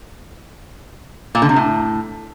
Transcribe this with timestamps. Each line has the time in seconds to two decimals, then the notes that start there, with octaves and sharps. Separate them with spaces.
1.35 A#2
1.42 D3
1.49 C3
1.56 A2